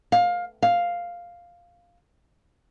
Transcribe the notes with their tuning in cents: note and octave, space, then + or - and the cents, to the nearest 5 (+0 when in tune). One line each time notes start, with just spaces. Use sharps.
F5 +20
F5 +0